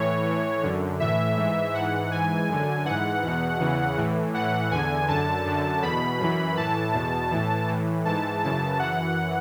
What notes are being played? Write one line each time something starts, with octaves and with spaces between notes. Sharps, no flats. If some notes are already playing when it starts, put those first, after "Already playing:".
Already playing: A2 E3 C#5
A2 E3
F#2 D3
A2 E3 E5
G#2 E3
G#2 E3 F#5
G#2 E3 G#5
F#2 D3
G#2 E3 F#5
E2 B2
E2 C#3 E3
A2 E3
A2 E3 F#5
E2 D3 G#5
F#2 D3 A5
F#2 D3
E2 B2 B5
F#2 E3
A2 E3 A5
E2 B2
A2 E3
A2 E3
G#2 E3 A5
F#2 C#3 E3 A5
F#2 E3 F#5